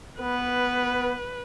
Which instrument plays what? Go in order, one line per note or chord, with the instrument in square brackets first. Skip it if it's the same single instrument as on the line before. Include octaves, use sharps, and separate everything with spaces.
[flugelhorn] B3 [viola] B4